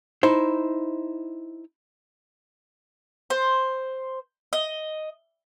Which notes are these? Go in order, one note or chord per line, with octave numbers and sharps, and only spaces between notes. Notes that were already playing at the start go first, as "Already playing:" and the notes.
D#4 E4 C5
C5
D#5